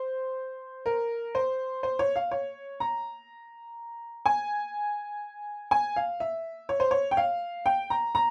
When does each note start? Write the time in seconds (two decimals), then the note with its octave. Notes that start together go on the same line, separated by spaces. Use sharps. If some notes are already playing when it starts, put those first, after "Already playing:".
Already playing: C5
0.86 A#4
1.35 C5
1.83 C5
1.99 C#5
2.16 F5
2.31 C#5
2.80 A#5
4.26 G#5
5.71 G#5
5.96 F5
6.20 E5
6.69 C#5
6.80 C5
6.91 C#5
7.11 G5
7.17 F5
7.66 G5
7.90 A#5
8.15 A#5